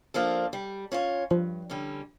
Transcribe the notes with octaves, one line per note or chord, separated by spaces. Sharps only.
F3 A#3 D4 A4
G3
C#4 F4 C#5
G2 F3
D3 G3 C#4 E4